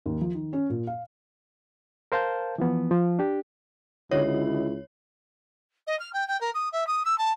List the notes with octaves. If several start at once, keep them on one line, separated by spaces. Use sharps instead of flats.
D#2
F3
D#3
C#4
A#2
F5
A#4 C5 F5 A5 G6
E3 F3 B3
F3
D4 G4
C#2 D3 E4 F#4 C#5 D#5
D#5
F6
G5
G5
A#4
D#6
E5
D#6
E6
A5